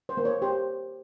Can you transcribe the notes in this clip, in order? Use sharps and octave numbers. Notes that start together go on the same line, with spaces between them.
C5
A#3
C#5
G4 C5